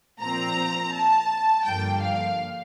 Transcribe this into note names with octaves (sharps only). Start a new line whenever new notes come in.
A#2 F3 C4 A#5
A5
G2 D3 F3 A#3 G5
F5